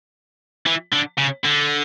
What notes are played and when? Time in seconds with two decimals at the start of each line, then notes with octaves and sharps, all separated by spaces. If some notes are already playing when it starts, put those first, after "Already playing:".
0.66 E3
0.92 D3
1.18 C#3
1.45 D3